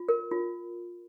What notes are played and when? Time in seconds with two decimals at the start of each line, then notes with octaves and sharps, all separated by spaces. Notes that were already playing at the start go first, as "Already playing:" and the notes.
Already playing: F4
0.09 A#4
0.31 F4